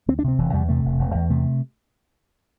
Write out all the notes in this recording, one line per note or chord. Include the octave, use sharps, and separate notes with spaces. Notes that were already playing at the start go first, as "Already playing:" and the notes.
D2 C4
D4
C3 C4
E1 E3
E2 G3
C3 A3
E1
E1
E2
C3 A3